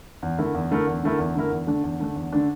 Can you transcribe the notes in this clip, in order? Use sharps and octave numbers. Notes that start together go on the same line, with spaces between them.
E2
D3 A3 E4 A#4
E2
D3 A3 E4 A#4
E2
D3 A3 E4 A#4
E2
D3 A3 E4 A#4
E2
D3 A3 D4
E2
D3 A3 D4
E2
D3 A3 D4